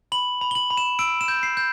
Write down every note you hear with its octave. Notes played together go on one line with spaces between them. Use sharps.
B5 F#7
B5
G7
F#7
B5
E7
E6 D7
E7
G6
C7
G6